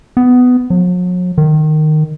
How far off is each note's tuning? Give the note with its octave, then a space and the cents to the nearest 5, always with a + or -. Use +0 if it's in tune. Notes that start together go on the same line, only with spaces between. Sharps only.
B3 +15
F#3 -45
D#3 -15